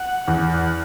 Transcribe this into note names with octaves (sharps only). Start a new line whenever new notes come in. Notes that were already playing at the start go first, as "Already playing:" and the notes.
Already playing: F#5
E2